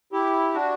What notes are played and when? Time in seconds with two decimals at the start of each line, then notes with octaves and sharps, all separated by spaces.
0.12 E4 G4
0.54 D4 F#4